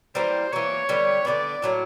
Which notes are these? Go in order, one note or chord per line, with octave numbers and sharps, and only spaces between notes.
E3 G3 A#3 C5
E3 G3 A#3 C#5
D3 G3 B3
D3 G3 B3 D5
A2 F#3 A#3